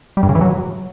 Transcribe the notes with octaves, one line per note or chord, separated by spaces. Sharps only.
G3
G2
C#3
E3
F#3